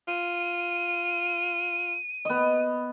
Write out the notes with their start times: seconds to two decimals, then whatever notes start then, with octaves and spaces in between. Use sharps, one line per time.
0.08 F4 D#7
2.25 B3 D#5